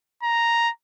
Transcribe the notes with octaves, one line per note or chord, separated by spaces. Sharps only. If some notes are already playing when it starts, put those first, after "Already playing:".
A#5